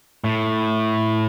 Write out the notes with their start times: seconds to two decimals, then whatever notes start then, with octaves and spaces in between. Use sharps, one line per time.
0.24 A2